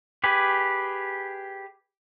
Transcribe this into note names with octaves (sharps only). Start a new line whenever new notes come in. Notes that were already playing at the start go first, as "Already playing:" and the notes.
G4 G#4 B4